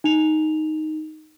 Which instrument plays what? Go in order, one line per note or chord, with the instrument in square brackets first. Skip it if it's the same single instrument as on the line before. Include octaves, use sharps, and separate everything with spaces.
[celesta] D#4 F7